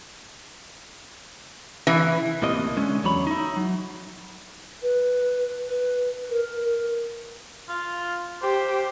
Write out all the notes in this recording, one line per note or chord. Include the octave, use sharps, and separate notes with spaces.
E3
C#2 A2 C3 A#3 D#5
D3 G#3 C#4
E2 D3 F#3 C#5 B5
D#4 E4
F#3
B4
B4
A#4
F4
G4 C5